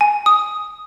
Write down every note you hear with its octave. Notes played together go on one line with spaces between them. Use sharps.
G#5
D#6